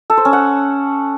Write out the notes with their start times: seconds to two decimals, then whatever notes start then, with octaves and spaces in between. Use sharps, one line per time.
0.10 A4
0.17 C5
0.25 C#4
0.33 F#5